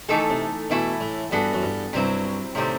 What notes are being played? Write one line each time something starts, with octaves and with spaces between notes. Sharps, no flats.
D#3 E3 A3 D#4 A4
C3
B2 E3 A3 E4
A2
G2 E3 B3 F#4 A4
F#2
G2
G2 C3 F#3 C4 E4
A2 C3 D#3 G3 C4